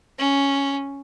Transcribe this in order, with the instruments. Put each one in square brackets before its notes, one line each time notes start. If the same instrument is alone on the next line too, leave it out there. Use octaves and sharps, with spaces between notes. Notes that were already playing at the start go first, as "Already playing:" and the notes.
[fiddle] C#4